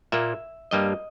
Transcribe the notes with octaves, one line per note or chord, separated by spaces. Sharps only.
A#2 A#3 E5
G2 G3 A#3 D#5